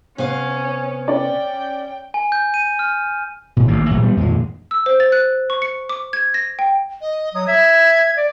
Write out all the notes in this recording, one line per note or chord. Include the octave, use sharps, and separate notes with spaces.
C3 B3 C#4 F5
C#4 D5 G5
G#5
G6
D#7
F6
G#2 B2
A1 D#3 A#3
A#2 E3 F#3 A3
G3 B3
F2 A#2 D#3 G#3
E6
C5
A6
F#6
C#6
C#7
D6
G#6
A#6
G5
D#5
F#3 D#6
E5 G#6
D5